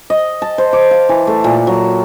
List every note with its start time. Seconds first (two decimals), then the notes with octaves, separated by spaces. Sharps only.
0.10 D#5
0.42 A5
0.58 C5
0.73 D6
0.91 F5
1.09 E3
1.27 A3
1.44 A#2
1.67 F#3